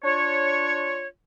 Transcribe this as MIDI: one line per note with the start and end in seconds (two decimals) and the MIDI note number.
0.04 1.07 62
0.04 1.07 65
0.04 1.07 73